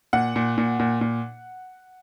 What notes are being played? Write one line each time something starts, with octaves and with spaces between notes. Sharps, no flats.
A#2 F#5
A#2
A#2
A#2
A#2